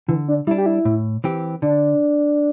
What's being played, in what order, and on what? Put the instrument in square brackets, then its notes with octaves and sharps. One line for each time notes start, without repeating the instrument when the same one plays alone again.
[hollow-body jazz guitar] D3 [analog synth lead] E3
[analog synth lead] D4
[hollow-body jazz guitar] G3 D4 [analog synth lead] E4
[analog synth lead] G4
E4
[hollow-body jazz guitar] A2
E3 C4 G4
[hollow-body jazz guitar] D3 [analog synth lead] D4